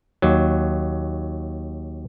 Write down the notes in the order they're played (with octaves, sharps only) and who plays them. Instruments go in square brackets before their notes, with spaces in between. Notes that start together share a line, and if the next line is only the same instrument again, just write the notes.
[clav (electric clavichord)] D#2 F#3